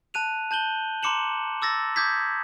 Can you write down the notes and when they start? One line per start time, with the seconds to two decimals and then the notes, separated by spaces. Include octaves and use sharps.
0.14 A5 F#6 D#7 F7
0.51 A5 G6 F#7 G7
1.03 A#5 C6 D6 C#7 E7 F#7
1.62 D6 E6 A6 A#6
1.96 D6 D#6 G6 G#6 B6